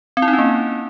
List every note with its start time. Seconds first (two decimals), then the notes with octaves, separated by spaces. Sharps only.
0.17 C4
0.22 E4
0.28 D#4
0.33 C#4
0.38 A#3